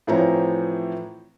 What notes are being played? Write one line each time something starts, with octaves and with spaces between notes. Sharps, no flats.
A2 E3 F3 C4 C#5 A#5